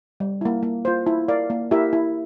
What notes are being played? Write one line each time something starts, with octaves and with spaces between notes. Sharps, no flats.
G3
A#3 E4
A#3
F4 C5
E4
A#4 D5 F5
A#3
E4 G4 A#4 E5
E4